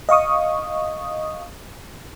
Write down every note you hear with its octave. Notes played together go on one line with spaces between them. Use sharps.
D#5 F5 C#6 D#6